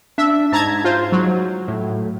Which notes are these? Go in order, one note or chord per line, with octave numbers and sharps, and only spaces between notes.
D4 E5
G#2 A5 A#5 G#6
F4 C5
F#3
A2